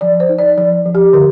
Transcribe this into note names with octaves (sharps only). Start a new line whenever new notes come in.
F3 D5
C5
D#4
D5
F3 D5
F3
G4
D3 A#4